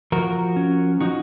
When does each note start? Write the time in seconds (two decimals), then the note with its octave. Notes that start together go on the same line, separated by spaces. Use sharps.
0.12 F3 F#4 A#4
0.56 C#4
1.01 F3 D#4 F#4